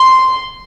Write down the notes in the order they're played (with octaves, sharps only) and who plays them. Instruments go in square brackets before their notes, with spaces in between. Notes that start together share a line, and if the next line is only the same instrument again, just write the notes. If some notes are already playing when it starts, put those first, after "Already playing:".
Already playing: [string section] C6